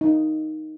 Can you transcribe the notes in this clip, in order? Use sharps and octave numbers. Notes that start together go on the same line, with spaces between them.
D#4